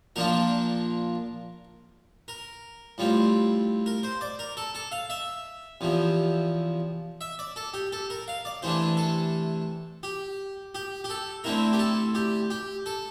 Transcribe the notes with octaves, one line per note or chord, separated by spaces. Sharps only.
A#2 F3 A#3 D4 F4 A#4
A#4
A2 G3 C4 F4
A#4
C5
D5
A#4
A4
A4
F5
E5
E2 C3 F3
E5
D5
A4
G4
A4
A#4
F5
D5
C3 E3 A3 D4 C5
A4
G4
G4
G4
A4
D3 A3 C4 E4 A#4
G4
A4
G4
G4
A4